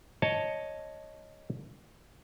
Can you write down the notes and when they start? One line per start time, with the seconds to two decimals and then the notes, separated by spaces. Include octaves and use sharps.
0.22 C#5 D#5 A5